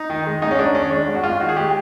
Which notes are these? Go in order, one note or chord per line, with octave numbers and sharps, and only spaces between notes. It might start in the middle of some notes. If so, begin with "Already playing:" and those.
Already playing: D#4
D#3
G#3
G#2 D#4
C#4
G#2 D4
D#3 C#4
G#3 D4
G#2
F#4
G#2 F4
D#3 F#4
G#4
G#3 G4